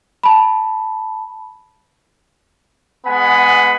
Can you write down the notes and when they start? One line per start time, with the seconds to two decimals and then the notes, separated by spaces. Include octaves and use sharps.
0.23 A5 B5
3.06 G#3 B3 F#5 G#5 B5